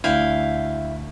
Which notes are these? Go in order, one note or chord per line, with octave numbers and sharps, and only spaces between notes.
D2 D4 E4 F5 G5